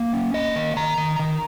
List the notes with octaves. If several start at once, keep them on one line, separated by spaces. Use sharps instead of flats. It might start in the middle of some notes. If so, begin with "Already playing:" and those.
Already playing: A#3
C#4
A#3 D#5
D#3
D#3 A#5
D#3
D#3